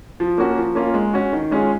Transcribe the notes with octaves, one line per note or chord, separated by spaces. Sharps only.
F3
A#3 C#4 F#4
F3
A#3 C#4 F4
G#3
C#4 F#4
D#3
G#3 C#4 F4 G#4